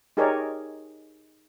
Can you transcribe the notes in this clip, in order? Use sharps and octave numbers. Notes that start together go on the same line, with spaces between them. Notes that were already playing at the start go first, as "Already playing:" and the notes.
D#4 G4 G#4 A#4 C#5 D5